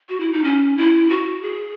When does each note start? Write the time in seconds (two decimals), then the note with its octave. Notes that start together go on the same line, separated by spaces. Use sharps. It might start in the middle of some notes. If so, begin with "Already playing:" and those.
0.09 F#4
0.20 E4
0.33 D#4
0.44 C#4
0.77 E4
1.10 F#4
1.42 G#4